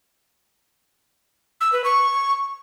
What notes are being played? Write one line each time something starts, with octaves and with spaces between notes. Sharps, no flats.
E6
B4
C#6